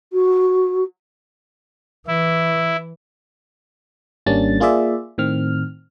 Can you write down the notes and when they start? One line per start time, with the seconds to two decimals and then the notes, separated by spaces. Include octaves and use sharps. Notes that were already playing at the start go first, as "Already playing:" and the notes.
0.12 F#4
2.08 E3 E4
4.26 G#1 G3 A#3 C#4 D4 A6
4.60 A#3 F4 G#4 D5 E5
5.18 A2 D#3 C4 F6